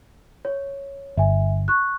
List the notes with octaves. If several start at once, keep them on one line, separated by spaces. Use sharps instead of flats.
C#5
G1 E5 G#5
C#6 F#6